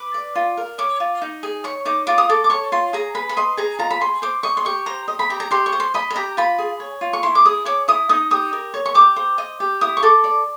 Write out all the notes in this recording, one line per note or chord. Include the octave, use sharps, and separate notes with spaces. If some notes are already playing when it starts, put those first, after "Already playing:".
Already playing: B4 D6
D5
F4
A#4
C#5 D6
F4
D#4
G#4
C#5 C#6
D#4 D6
F4 D6
D#6
A4 D6
D6
C#5 C#6
F4 C6
G#4 A#5
B4 B5
B5
D#5 C6
G#4 A#5
F4 A#5
B5
G#4 C6
C5 D6
D#5 C#6
C6
G4 C#6
C5 A#5
D#5
B5
G4 A#5
A#5
G4 C6
C#6
C5
C6
D#5 B5
B5
G4 A#5
F4 B5
G#4
C#5
F4
C#6
E4 C6
D6
G#4 D#6
C#5 D6
E4 D#6
D#4 D#6
G4 D#6
A#4
C#5
C#6
G4 D6
C5
D#5
G4
E4 D#6
C#6
A4 D6
D5